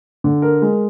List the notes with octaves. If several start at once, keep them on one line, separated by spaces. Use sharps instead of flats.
D3
A#4
G#3